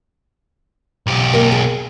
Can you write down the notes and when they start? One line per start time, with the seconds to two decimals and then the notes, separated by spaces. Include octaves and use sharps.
1.07 B1 G4
1.33 A#3 A#4
1.52 G#4